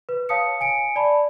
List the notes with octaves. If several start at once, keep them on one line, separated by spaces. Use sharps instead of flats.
B4
C#5 F5 A5 D#6 C#7
G#5 C#7 D7
D5 A5 B5